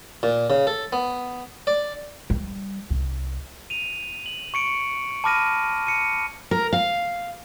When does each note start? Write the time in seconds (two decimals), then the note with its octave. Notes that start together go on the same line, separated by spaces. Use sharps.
0.23 A#2
0.50 C#3
0.67 A4
0.93 B3
1.67 D5
2.30 G3
2.90 C2
3.70 D#7 F7
4.26 F#7
4.54 C#6 C#7 D7
5.24 A5 B5 D6 F6 A#6 D#7
5.87 C#7 D#7
6.51 A#4
6.73 F5